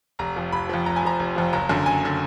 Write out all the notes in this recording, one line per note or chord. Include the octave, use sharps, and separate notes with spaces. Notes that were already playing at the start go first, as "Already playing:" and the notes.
F1 A#5
F2 F3
F1 B5
F2 F3
F1 A#5
G#5
F2 F3 A#5
F1
F2 F3
F#1 A#5
F#2 D3
F#1 G#5
D3